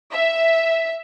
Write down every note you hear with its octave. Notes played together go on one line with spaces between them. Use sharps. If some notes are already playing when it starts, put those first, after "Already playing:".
E5